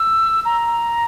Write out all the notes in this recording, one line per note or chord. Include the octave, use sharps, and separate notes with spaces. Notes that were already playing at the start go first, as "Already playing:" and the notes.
Already playing: E6
A#5